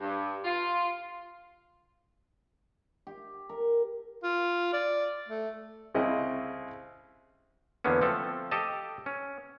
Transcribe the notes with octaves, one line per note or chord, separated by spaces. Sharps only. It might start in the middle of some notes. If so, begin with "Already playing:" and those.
G2
F4
G4
A#4
F4
D5
A3
C2 C#3 C4 E4 D#5
E2 D3 A#3 B3 C#4
F3 A3 C4 A4
G4 A4 D#5 A5
C#4